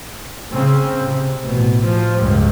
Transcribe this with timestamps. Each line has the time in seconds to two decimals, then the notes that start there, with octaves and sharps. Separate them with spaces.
0.51 C#3 C4
1.02 C3
1.43 A1 B2
1.83 F3
2.17 C#2 G2